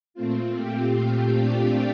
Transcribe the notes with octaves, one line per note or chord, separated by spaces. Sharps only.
A#2 A3 C4 F4
G4 G5
F4 F5
D4 D5